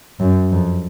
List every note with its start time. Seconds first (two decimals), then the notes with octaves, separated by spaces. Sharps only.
0.20 F#2
0.52 F2